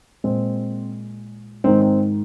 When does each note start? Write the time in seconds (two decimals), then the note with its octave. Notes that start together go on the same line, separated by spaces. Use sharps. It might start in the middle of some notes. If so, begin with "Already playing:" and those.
0.24 A#2 G#3 C4
1.64 G#2 D#3 G#3 C4
1.82 C4